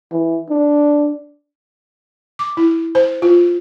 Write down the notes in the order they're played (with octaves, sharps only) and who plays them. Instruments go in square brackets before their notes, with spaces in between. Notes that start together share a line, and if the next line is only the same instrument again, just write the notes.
[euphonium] E3
D4
[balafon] D6
E4
C5
F4